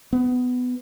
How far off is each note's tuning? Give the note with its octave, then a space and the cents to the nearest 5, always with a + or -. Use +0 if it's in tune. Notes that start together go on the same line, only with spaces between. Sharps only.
B3 +15